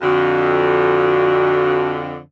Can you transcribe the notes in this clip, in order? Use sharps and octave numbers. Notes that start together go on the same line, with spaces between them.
F2 D3 F#4